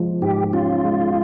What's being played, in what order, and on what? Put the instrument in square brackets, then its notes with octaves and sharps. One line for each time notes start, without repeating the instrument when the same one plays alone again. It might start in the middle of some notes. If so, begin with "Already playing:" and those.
Already playing: [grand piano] F3 G#3
[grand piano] G#2 [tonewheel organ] G4
[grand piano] C#4 [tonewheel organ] F4
[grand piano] G#3